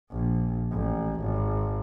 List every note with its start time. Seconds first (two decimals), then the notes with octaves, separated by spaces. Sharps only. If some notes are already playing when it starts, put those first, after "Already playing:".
0.11 A#1
0.71 A1
1.21 G#1